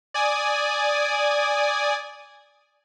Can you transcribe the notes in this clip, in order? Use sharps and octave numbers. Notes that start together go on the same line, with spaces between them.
D5 G#5 D#6